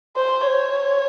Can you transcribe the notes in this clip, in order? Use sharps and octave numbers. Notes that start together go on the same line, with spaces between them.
C5
C#5